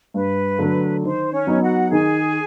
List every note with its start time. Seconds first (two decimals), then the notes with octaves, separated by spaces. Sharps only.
0.14 G2 B4
0.59 D3 F#3 A3
1.03 D#3 C5
1.32 C#4 C#5
1.47 F#3 B3 D#4
1.62 F#4 F#5
1.91 D#3 G#4 G#5